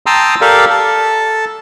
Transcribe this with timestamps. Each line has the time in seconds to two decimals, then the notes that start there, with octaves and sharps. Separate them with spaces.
0.06 G5 A5 A#5 C6 D#6 E6
0.41 G4 A4 A#4 D5 F5
0.70 A4 A5